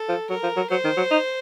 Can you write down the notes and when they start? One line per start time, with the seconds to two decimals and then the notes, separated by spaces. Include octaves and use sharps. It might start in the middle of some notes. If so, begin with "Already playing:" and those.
Already playing: A4
0.09 F3
0.30 F#3 A#4
0.43 F3
0.56 F#3
0.70 F#3 C5
0.84 D#3
0.97 F#3
1.11 D#4